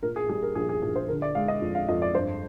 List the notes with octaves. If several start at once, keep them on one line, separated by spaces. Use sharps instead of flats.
A#2 A#4
G#4
G3 G#4
A#4
A#1 G#4
G#4
A#1 G#4
C5
D3 A#4
D5
G#3 F5
D#5
F2
F5
F2 D#5
D5
G2 C5